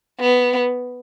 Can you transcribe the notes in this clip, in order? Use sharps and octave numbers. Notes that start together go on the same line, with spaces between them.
B3